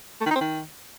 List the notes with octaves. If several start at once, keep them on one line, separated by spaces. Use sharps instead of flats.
A3
D#3
D#4
C4
D#3